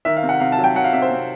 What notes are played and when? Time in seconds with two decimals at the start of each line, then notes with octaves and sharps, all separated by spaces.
0.05 D#3 E5
0.17 F5
0.23 C3
0.29 F#5
0.40 C3 F5
0.52 A5
0.58 F#3
0.64 G5
0.75 F#3 F#5
0.84 F5
0.93 C3 E5
1.02 C5
1.11 C3